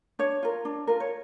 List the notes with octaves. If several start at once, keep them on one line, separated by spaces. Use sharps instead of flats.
D4 C#5
F4 A#4
D4
F4 A#4
C#5